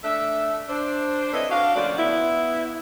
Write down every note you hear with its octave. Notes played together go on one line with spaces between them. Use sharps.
A3 D4 A4 E5
D4 C5
C4 E4 A4 B4 C#5 D#5
D4 F#4 F5
D2 F3 A#3 C#4 F#4 D5
B3 E4